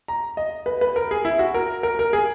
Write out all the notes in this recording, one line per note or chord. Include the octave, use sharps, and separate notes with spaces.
A#5
D#5
B4
B4
A#4
G#4
E4
F#4
A#4
A#4
A#4
G#4